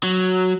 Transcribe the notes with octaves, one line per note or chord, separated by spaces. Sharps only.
F#3